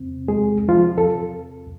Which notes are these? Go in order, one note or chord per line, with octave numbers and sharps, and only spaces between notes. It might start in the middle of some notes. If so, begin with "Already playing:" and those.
Already playing: E2 C3 C4
G#3 G#4
F3 F4
A4